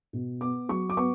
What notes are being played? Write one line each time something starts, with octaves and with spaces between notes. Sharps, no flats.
B2
B3 D6
F#3 C#6
D6
B3 C#6